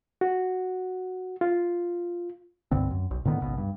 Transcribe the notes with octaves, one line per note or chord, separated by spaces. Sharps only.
F#4
F4
C2 G2 D3 C4
F#2
B1
A2 D3 D#3 B3
G#1 C#2 B2
G2